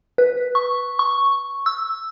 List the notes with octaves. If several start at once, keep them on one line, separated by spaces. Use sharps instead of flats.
B4
C#6
C#6
E6